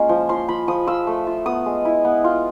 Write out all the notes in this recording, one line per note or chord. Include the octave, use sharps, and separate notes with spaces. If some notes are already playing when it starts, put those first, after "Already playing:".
Already playing: G#3 A#3 C#4 F4
F3
F3 C6
F3 B5
F3 D#6
F4 E6
A3
F4
B3 D#6
G#3
E4
B3
F4